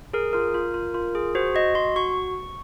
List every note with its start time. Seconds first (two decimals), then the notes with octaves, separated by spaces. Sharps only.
0.14 G#4 A#4
0.33 F4 A#4
0.54 F4
0.74 F4
0.94 F4
1.15 G#4
1.35 F#4 C5
1.55 F#4 D#5
1.75 F#4 C6
1.96 F#4 C#6